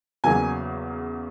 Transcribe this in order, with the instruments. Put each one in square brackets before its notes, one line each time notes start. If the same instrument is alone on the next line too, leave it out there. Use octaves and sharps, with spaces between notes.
[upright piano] E2 C#3 F#3 A#3 G#5